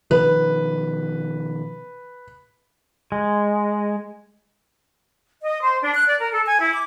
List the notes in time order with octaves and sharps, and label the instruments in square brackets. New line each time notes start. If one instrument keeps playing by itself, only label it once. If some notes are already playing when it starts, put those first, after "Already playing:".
[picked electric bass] B2 D#3 F3 [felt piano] B4
[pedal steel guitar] G#3
[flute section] D#5
C5
D4
F#6
D5
A#4
A4
G#5
E4
D6